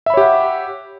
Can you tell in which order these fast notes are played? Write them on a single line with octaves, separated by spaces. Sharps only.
E5 B5 C#5 G4 F#5